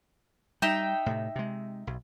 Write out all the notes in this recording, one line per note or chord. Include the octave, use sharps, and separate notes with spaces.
G3 D#4 E5 G5
A2 C3
C3 G#3
B1